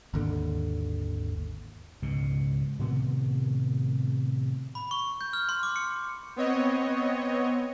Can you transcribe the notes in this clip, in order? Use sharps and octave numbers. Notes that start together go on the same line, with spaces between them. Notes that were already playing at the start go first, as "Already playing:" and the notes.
G#1 D#2 D3
C#2 G#2 B2
A2 C3 D#3 B3
B5
C#6
G6
F6
C6
D6
C#7
B3 C4 C#5 D#5